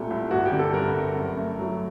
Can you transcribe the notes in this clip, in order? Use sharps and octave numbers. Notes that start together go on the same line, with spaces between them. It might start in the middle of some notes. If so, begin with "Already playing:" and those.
Already playing: C2 A#2 A3 G4 A4
C2
G1 F#4
G4
D3
A4
G2 A#4
G1
F#2
A3
F#3